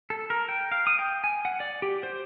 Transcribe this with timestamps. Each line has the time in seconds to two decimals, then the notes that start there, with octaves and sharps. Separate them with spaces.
0.10 A4
0.30 A#4
0.49 G5
0.72 F5
0.87 D#6
0.99 G5
1.24 G#5
1.45 F#5
1.60 D5
1.82 G4
2.03 C5